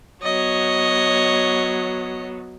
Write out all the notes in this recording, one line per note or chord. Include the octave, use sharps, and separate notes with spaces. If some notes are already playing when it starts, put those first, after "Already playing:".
F#3 B3 C#5 D#5